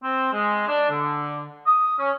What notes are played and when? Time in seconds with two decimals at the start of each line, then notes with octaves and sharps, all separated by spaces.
0.04 C4
0.33 G#3
0.68 D4
0.90 D3
1.67 D#6
1.98 C#4